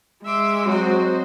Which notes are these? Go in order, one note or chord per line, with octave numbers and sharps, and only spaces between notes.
G#3 E5 C6 D6
F#3 C4 F#4 C5 D#5